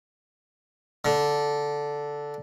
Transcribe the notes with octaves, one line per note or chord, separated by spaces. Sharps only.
D3